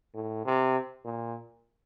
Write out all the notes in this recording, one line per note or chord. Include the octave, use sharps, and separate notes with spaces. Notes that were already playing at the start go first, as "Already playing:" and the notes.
A2
C3
A#2